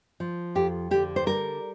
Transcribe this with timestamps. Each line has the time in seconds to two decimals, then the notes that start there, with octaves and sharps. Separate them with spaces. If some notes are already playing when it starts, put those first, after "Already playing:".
0.20 F3
0.55 F2 G4
0.91 D3 G4
1.16 C5
1.26 G3 A#4